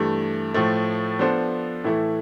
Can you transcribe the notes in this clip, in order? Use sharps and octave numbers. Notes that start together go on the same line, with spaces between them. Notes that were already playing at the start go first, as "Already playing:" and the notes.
Already playing: G2 E3 A3
A2 F3 A3
F3 B3 D4 A4 C5
A2 E3 A3 E4 A4